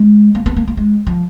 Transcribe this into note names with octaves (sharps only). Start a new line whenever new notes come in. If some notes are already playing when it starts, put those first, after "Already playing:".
Already playing: G#3
A#3
B3
A#3
A#3
G#3
F3